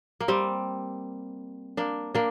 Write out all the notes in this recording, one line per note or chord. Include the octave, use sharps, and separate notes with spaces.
A#3
G3 C4
A#3 D4
A#3 D4